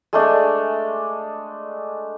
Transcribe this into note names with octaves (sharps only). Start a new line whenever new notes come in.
G#3 A3 D4